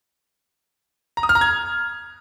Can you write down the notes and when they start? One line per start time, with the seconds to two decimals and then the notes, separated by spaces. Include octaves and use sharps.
1.17 A#5
1.23 D#6
1.29 F6
1.35 A#5
1.41 G#6